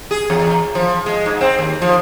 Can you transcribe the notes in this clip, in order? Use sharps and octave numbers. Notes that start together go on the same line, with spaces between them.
G#4
E2
F3
G#3
G#2
C4
D#2
F3